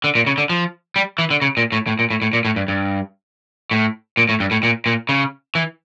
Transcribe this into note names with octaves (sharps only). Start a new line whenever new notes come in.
D3
A#2
C#3
D3
F3
G3
E3
D3
C#3
A#2
A2
A2
A#2
A2
A2
A#2
A2
G2
G2
A2
A#2
A2
G2
A2
A#2
A#2
C#3
E3